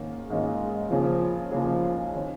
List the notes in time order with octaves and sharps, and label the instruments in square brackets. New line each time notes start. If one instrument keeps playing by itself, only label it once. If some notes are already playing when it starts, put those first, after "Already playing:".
Already playing: [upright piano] G#2 D#3 A#3 C#4 F4
[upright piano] G#2 D#3 A#3 C#4 F4 [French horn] G#3
[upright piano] C#2 C#3 A#3 C#4 G#4 [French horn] F3
[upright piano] C#2 C#3 A#3 C#4 G#4 [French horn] F3
[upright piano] D#3 C#4